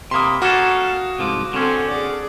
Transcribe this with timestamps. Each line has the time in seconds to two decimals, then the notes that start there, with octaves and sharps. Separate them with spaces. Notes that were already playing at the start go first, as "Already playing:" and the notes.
0.11 C3 A#3 B5 C6 D#6
0.42 A#3 C#4 F#4 A4 F5
1.18 C2 G#2 F3 D6
1.53 D3 C4 C#4 A4
1.89 G#4 D5